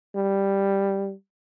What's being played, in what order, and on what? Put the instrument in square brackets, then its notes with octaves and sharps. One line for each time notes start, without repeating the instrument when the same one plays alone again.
[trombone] G3